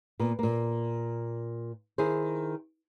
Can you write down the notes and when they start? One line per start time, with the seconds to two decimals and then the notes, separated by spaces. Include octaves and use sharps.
0.20 A#2 B3
0.39 A#2 A#3
1.98 D#3 E4 G#4 C5